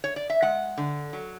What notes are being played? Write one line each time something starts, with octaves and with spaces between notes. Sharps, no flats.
C#5
D5
E5
G#3 F#5
D3
F#3